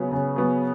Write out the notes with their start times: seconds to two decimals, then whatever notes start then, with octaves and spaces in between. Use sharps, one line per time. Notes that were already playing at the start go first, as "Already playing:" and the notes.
Already playing: C#3 F#3 B3
0.12 C#3
0.36 F#3 B3